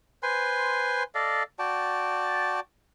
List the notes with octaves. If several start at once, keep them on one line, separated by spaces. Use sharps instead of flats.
B4 C5 G#5 C6
A4 D5 D#5 F5
F#4 D5 G5 A5